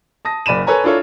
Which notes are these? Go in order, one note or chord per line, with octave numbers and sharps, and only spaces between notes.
A5 D#6 A#6
F#1 D5 B5 D#7 E7
A4 B4 C#5 G#5 A#5
D4 E4 F4 A4 C#5